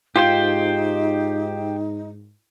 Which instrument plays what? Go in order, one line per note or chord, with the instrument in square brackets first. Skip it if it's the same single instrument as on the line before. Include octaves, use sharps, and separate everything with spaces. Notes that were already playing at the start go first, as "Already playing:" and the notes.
[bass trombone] G#2 [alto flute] D#4 [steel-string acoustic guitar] F4 [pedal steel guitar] G4 C5 G5